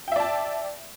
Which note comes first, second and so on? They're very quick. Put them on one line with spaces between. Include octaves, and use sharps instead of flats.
G5 E5 D5 A5